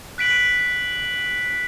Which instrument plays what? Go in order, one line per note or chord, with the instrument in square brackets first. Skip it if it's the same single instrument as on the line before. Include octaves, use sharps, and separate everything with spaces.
[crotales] F#6 B6 D7 F#7